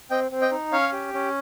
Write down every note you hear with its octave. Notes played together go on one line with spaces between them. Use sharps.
C4 D#5 G5
C4
D#5 G5
D#4
C#4 C#5 F5
G4
C#4